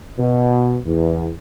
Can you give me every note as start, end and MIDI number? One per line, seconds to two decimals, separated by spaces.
0.18 0.76 47
0.86 1.30 40